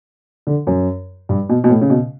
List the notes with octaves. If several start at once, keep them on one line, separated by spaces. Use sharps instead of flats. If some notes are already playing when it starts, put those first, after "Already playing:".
D3
F#2
G2
B2
B2
A2
C#3
B2